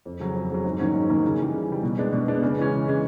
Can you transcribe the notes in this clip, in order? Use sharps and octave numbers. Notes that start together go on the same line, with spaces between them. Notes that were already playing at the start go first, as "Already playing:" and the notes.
F2
C#3 F#3
F2
C#3 F#3
G#2
D#3 F#3 A#3 C#4
G#2
D#3 F#3 A#3 C#4
C#3
E3 G3
C#3
E3 G3
B2
G#3 B3 D4
B2
G#3 B3 D4
C#3
E3 G#3 C#4
C#3
E3 G#3 C#4